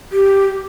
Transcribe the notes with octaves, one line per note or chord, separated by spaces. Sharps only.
G4